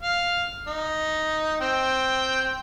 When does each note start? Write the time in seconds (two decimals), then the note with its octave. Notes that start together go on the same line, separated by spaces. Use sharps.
0.01 F5
0.67 D#4
1.61 C4 G5